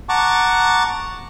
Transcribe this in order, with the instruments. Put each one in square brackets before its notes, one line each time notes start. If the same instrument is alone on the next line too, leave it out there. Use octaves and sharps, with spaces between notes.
[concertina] F#5 A5 A#5 C#6 D6